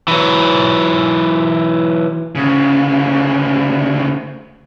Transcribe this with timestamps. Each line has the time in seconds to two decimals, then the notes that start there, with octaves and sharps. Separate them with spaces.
0.08 E3 F#3
2.35 D2 C#3